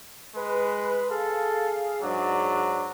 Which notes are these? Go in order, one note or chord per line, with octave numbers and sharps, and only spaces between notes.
G#3 B4
G#4 A4 F5
G#2 F#3 D4